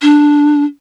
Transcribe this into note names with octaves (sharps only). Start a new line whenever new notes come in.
D4